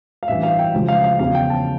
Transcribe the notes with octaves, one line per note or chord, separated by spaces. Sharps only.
F5
A1 G2 E3 E5
F5
G5
C#2 C#3 F3
F5
F5
E2 C#3 F3 F5
G5
A5